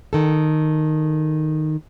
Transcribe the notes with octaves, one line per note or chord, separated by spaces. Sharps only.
D#3 A4